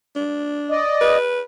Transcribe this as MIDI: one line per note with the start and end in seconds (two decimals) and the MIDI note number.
0.16 0.80 62
0.71 1.17 74
0.71 1.17 75
1.01 1.40 71